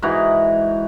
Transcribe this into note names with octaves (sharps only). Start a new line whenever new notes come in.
G#2 E3 F#4 A#5